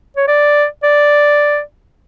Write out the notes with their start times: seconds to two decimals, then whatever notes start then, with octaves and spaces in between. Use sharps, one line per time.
0.17 C#5
0.28 D5
0.83 D5